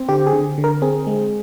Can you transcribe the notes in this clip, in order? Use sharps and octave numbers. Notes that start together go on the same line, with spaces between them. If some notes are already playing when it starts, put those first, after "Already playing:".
Already playing: C4
D3 G4
G#4
D3
D3
A#4
C4 G#4
G#3